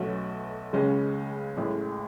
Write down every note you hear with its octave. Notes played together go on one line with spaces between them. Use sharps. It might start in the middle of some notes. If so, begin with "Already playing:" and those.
Already playing: B1 B2 A3 C#4 F#4
C#2 C#3 G#3 C#4
A1 A2 G#3